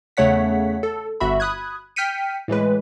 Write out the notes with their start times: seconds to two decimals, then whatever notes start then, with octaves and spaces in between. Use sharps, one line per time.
0.17 E2 C#3 A3 C#5 F#5 B6
0.83 A4
1.20 G1 F#4 E5 B5
1.40 B5 D#6 F#6 G#6
1.96 G5 F6 G6 B6 C#7 D#7
2.48 A2 E3 G#3 B4